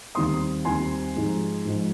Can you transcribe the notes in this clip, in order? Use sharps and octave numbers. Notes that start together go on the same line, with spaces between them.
D#2 D#3 G3 C4 C6 D#6
D#2 D#3 G3 C4 G#5 C6
G#2 F3 G#3 D#4
G#2 F3 G#3 D#4